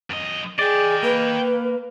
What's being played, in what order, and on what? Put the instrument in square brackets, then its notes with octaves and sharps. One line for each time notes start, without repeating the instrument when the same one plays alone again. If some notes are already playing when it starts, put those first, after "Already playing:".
[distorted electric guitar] F#2 D#5
[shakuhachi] G#4 [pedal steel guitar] D5 [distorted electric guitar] D#5 G5
[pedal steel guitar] A#3 [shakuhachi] B4